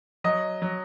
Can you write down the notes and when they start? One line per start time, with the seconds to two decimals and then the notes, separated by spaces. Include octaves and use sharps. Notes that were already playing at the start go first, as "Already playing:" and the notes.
0.24 F#3 D#5
0.62 F#3